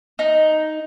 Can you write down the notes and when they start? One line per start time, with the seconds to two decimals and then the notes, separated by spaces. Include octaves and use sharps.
0.19 D#4